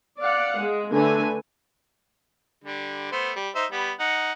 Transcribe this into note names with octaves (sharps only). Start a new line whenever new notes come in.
D5 F5 F#5
G#3
D3 A3 A4 B4 G#5
D3 G3
A3 B3 C5
G3
D#4 C5 E5
G3 B3
D#4 F#5